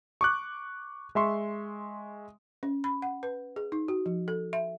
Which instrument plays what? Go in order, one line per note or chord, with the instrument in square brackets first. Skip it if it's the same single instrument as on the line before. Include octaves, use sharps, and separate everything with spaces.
[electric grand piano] C#6 D6 F#6
G#3 E5 C6 C#6
[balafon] C#4
B5
F#5
B4
G#4
D#4
F#4
F3
A4
E5